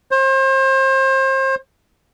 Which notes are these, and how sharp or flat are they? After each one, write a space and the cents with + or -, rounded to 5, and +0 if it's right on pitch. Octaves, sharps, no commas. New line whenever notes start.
C5 +35